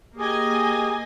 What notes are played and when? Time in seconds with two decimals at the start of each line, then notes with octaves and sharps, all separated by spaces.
0.17 A#3 G4 G#4 D#5 G#5